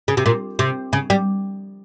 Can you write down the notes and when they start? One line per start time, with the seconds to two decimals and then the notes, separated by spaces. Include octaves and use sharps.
0.08 C#3
0.17 C3
0.26 A#2
0.59 C3
0.93 C#3
1.10 G3